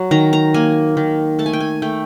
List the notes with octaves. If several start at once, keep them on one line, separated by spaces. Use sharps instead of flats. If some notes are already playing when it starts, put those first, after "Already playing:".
Already playing: F#3
D#3 A#5
A#5
A#3 G#5
D#3
A3 A5
G#5
G5
G#5
A3 G5